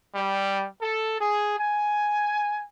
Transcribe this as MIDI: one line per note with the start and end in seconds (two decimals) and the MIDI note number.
0.15 0.65 55
0.81 1.20 69
1.20 1.55 68
1.57 2.62 80